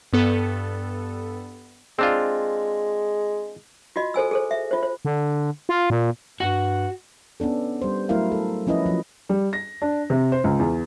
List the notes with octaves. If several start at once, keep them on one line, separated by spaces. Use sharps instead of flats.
G2 B3 A4
G#3 C4 D4 F4
F4 F#4 D#5
A4 C5 G#5 E6
G#4 A4 C5
E5
F4 C5
C5
D3
F4
A#2
G2 F#4 F#5
B3 C#4 D4 A4
G3 C5
F#3 A3 E4 A#4 F5
A4
F3 C#4 E4 B4 D#5
F3 F#3
G3
A#6
D4
C3
C5
C#2
E2